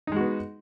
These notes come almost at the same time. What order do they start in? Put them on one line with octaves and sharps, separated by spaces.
D#4 G#3 F#4 B3